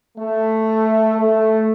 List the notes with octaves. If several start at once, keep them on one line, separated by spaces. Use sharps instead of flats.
A3
A3